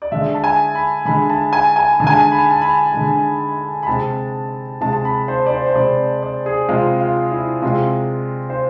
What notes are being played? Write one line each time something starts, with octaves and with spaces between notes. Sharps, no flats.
D5
D3 G#3 E5
A5
G#5
B5
D3 G#3 B5
A5
G#5
G#5
D3 G#3 G#5 A5
A5
B5
A5
B5
D3 G#3
B5
C3 G#3 A5
C3 G#3 A5
A5
B5
C5
D5
C5
C5
C3 G#3 D5
D5
G#4
C3 G#3 F4
F4
E4
C3 G#3 F4
C5